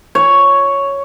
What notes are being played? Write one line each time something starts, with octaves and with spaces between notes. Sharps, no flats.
C#5